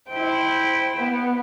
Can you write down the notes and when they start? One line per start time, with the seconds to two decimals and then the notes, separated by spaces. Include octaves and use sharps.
0.10 E4 C5 G5
0.97 B3